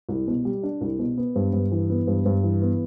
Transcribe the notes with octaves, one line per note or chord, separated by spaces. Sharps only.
C2
B2
G3
D4
C2
B2
B3
G2
G2
E3
B3
G2
G2
E3
B3